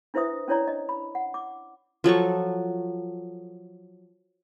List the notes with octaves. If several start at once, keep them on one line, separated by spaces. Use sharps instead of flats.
D4 E4 B4 C5 E5 D#6
C#4 D4 E4 C#5 D5 A#5
D#5
B5
F#5
D6
F3 F#3 A4 C#6